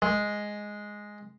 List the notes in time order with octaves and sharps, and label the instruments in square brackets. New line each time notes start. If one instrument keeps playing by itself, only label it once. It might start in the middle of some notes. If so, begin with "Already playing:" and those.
[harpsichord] G#3